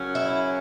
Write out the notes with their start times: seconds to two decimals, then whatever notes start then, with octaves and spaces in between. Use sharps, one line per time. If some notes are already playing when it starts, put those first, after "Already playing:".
Already playing: F#2 C#3 F#3 C#4
0.15 E4